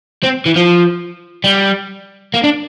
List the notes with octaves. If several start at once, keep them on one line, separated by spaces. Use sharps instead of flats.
C4
E3
F3
G3
A#3
D4